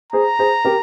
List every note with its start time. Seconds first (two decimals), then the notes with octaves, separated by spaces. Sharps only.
0.13 G#4 C5 A#5
0.39 G#4 C5
0.65 G4 A#4